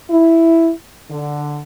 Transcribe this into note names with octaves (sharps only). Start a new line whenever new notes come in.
E4
D3